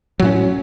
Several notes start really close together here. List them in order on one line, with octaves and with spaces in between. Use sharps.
F#3 A2 C#4